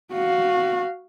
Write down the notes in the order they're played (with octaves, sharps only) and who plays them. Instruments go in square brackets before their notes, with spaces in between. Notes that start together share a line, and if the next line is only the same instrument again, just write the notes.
[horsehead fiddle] F#4 F5